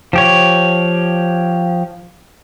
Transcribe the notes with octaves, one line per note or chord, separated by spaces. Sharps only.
F3 G4 C#5